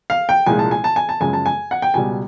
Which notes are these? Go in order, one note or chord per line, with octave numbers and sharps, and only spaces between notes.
F5
G5
C2 A#2 F3 G#3 G#5
A5
G#5
A5
G#5
A5
F#2 C#3 F3 G#3 G#5
A5
G#5
F#5
G5
C#2 B2 G3 G#5